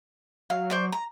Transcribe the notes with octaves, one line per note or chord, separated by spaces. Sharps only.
F#3 F5
C5 D5 C#6
A#5